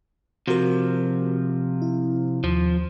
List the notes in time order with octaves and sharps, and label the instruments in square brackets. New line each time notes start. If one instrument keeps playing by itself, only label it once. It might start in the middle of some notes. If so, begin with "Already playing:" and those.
[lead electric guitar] C3 F3 [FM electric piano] F#4 A#4
[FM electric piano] E4
[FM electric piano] D#2 [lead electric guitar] F3